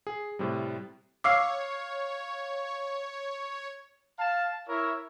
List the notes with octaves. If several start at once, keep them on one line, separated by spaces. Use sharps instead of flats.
G#4
A2 C3 G3
C#5 F5 D6 E6 C7
F5 A5
E4 A#4 C#5 E5